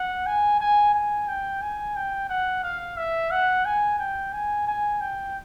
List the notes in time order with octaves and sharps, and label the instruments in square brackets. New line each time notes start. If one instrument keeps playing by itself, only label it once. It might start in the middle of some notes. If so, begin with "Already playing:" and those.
Already playing: [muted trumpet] F#5
G#5
G#5
G#5
G5
G#5
G5
F#5
F5
E5
F#5
G#5
G5
G#5
G#5
G5